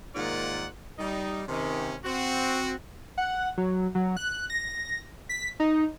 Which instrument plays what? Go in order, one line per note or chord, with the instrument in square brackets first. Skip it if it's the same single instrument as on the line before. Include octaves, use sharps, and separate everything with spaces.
[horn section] G#2 D#3 A#3 F4 D5 F#5
G3 D#4
C3 D#3 C#4
C4 F#4
[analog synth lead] F#5
F#3
F#3
F#6
A#6
B6
D#4